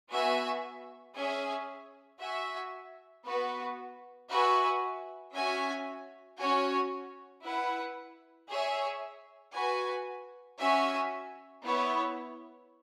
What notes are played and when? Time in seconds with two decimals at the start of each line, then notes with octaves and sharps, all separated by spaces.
0.10 B3 F#4 E5 G#5
1.16 C#4 G#4 E5 G#5
2.19 F#4 E5 G#5
3.25 B3 F#4 B4
4.30 F#4 B4 E5 G#5
5.34 C#4 F#4 E5 G#5
6.39 C#4 F#4 C#5 G#5
7.44 E4 B4 F#5
8.49 G#4 C#5 E5 G#5
9.54 F#4 B4 G#5
10.59 C#4 F#4 E5 G#5
11.64 B3 E4 C#5